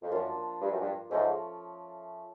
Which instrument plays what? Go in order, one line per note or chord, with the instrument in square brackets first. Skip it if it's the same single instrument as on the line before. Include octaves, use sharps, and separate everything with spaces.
[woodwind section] F2
[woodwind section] F#2 [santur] F3 A#3 D4 F4
[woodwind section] G2
F#2
G2
[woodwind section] G#2 [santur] F3 A3 C#4